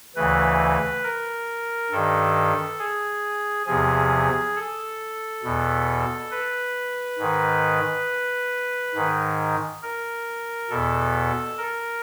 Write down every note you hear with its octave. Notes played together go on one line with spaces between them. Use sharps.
D2 C#3 E3 B4
A#4
G2 D#3 A4
G#4
E2 C3 F3 G#4
A4
E2 B2
B4
G#2 D#3
G#2 D#3
A#4
E2 B2 A4
A#4